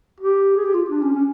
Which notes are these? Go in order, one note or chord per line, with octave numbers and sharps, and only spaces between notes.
G4
G#4
G4
F4
D4
C#4
C#4